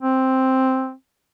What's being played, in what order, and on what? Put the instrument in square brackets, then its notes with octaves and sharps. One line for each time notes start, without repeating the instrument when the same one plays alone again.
[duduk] C4